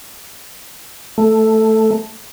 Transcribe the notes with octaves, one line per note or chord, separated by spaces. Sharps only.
A3